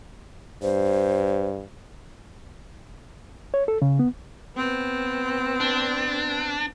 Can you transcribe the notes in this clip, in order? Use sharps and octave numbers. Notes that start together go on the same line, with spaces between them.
G2 C5
C#5
A4
C#3
B3
B3 C4
D4